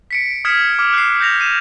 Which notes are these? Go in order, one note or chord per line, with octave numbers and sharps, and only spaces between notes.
B6 C#7 D7
D#6 F6 G#6 B6 C#7 E7
D6 F6
F#6 C7
G6 A#6 F7
C7 D#7 E7